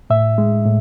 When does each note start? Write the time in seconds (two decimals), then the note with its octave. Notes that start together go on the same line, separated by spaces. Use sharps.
0.10 A2 E5
0.38 G#3
0.65 A2